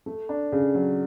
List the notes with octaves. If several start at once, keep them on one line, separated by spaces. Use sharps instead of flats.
A3
D4
C#3
F#3